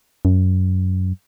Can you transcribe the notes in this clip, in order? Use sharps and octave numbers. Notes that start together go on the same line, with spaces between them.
F#2